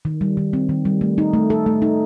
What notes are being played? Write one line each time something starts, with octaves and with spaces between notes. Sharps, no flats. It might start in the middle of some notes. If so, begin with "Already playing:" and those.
D#3
G3
D#3
C4
D#3
G3
A3
D#4
A3
A4
A3
D#4